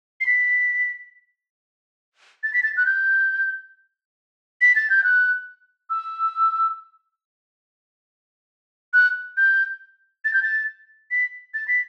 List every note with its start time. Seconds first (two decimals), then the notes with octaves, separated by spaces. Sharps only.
0.21 C7
0.26 B6
2.43 A6
2.53 B6
2.63 A6
2.77 F#6
2.86 G6
4.61 B6
4.76 A6
4.90 G6
5.04 F#6
5.90 E6
8.93 F#6
9.37 G6
10.25 A6
10.34 G6
10.43 A6
11.11 B6
11.54 A6
11.68 B6